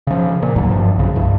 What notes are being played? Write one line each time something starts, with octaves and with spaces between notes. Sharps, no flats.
C#3 F3
A#2
G1 D#2 G#2 F#3
G2 F3
B1 C#3
C2 G2